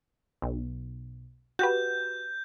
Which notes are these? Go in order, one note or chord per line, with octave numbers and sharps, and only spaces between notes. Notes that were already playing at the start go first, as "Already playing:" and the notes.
B1
F#4 G4 B4 G6